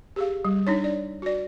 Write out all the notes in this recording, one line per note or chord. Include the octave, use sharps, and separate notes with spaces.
G4 G#4 F5
G3
D4 D#4 C#5
D5
F#4 D5